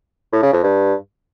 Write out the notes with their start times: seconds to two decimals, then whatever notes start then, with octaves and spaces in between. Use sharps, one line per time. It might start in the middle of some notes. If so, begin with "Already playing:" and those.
0.32 A2
0.43 C#3
0.53 F2
0.63 G2